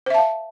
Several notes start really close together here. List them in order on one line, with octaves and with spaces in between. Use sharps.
C5 E5 A5 F5